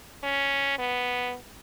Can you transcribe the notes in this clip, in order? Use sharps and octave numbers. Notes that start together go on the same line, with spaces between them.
C#4
B3